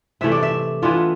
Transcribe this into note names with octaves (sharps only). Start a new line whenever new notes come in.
C3 E3 A3 E5
D5
E5
E3 B3 D4 F4